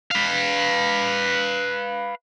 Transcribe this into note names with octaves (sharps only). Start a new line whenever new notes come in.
B4 F5